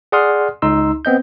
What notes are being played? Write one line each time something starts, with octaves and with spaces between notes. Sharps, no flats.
G#4 D5 F#5 C6 D#6 F6
C#2 D#4 C6 E6
B3 C4 D#5 G6